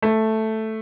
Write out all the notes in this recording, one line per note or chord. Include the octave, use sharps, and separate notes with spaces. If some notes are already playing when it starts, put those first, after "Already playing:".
A3